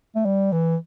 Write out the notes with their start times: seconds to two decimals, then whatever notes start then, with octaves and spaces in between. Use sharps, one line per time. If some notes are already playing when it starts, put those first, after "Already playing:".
0.16 A3
0.25 G3
0.52 E3